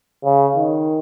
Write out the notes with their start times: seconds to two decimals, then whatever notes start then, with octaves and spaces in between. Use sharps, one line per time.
0.24 C#3
0.56 D#3